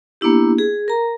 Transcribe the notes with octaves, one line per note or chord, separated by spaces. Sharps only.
A#3 B3 D4 E4 G4
G#4
A#4 A#5